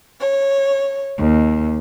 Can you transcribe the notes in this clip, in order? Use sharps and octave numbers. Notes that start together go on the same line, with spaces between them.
C#5
D#2